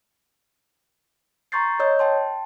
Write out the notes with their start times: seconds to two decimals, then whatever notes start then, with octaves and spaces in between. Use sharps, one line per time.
1.52 A#5 C6 C#6 G6 A6 C7
1.79 C#5 D#5 E6 G6
1.99 G5 A5 C6